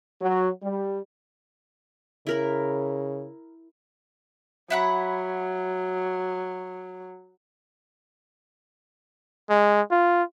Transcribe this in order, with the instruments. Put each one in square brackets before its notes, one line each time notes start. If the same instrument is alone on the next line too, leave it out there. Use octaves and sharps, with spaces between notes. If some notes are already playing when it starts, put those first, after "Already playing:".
[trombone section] F#3
G3
[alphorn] C#3 [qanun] E4 A#4 B5
[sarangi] F#3 [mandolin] E4 F#5 B5
[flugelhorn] G#3
F4